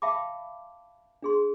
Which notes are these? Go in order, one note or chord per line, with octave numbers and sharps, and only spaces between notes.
E5 F5 G5 A5 B5 D6
D4 G#4 C6